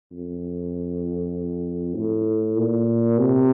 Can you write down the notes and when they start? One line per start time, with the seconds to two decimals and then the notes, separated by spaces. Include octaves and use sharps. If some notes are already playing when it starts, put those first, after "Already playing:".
0.12 F2
1.96 A2
2.58 A#2
3.19 C3